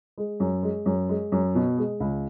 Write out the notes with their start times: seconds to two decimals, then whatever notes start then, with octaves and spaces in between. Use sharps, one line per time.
0.18 G#3
0.40 F#2
0.63 G#3
0.86 F#2
1.09 G#3
1.32 F#2
1.55 B2
1.78 G#3
2.00 C#2